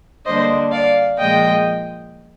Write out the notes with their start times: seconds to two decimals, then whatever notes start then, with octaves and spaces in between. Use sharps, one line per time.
0.25 D3 G3 A#3 D4 C5 D#5
0.71 D5 F5
1.18 A#2 F3 G#3 D#5 G5